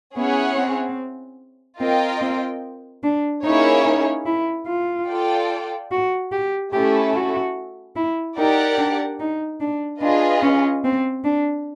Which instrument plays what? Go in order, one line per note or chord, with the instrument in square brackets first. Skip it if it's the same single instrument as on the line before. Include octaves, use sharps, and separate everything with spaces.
[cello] B3 [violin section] C#4 E4 G#4 C#5 F#5
[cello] C4
[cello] C4 [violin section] F4 A#4 D#5 G5
[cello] C4
D4
[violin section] A#3 C#4 E4 G#4 C#5 [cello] D#4
[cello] D#4
E4
F4
[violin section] F4 A4 D5 G5
[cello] F#4
G4
[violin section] A3 C#4 E4 A4 [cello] G4
[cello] F#4
E4
[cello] D#4 [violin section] G4 A#4 D5 F#5
[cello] D4
D#4
D4
[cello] D4 [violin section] F4 G#4 B4 D#5
[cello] C#4
C4
D4